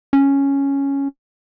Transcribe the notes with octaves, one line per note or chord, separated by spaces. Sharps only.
C#4